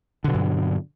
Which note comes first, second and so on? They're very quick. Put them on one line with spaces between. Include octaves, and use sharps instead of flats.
D3 B2 F#3 G2